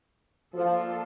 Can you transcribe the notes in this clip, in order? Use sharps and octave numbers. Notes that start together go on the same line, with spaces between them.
F3 A#3 D4 F4 A4